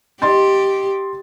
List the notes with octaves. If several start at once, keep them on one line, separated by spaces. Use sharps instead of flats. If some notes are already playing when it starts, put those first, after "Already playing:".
G4 D#5 C6 A6